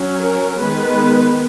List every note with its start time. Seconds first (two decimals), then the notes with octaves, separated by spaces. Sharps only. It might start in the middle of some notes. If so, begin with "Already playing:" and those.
Already playing: F#3 C#4
0.20 A#4
0.60 D#3 G#3 B3 B4